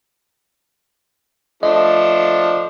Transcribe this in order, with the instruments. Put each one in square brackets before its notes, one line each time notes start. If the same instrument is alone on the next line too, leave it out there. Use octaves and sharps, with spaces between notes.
[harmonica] F3 A3 D4 [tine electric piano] D#5